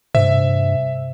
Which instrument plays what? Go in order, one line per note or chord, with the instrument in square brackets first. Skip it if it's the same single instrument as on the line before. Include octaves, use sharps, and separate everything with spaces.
[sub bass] G2 [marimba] C3 [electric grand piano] E5